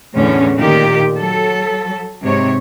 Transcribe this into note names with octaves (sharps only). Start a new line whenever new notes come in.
E2 A2 D3 C#4
A#2 D#3 G4
F#3 A4
G#2 C3 C#5